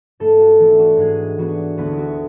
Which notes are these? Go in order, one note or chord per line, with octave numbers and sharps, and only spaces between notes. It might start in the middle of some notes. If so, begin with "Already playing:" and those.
G#2 A3 A4
F#4
E3 B3 D4 E4
F#4
G#2 G#3 G#4
E3 B3 D4 F#4
D2 B3 B4
E4
F#4